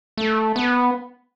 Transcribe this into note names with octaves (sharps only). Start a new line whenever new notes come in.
A3
B3